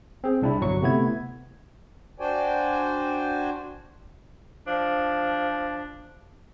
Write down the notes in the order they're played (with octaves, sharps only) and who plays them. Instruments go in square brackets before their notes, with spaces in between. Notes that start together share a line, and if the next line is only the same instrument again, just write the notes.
[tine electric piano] C4 G#4
C2 D4 E4
G1 F#3 C#6
C3 A3 B3 E4 G#6
[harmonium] D4 F#4 C5 D5 G5 G#5
[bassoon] F3 [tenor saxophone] D4